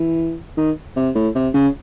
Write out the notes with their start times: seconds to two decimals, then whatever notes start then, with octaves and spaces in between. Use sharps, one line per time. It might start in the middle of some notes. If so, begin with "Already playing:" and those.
Already playing: E3
0.58 D#3
0.96 C3
1.15 A2
1.35 C3
1.54 C#3